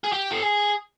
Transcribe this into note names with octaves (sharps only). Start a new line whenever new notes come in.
G#4
G4
A4
G#4